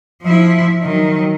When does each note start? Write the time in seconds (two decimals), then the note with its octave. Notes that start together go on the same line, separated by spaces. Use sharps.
0.23 F3 E4
0.83 D#3 F#3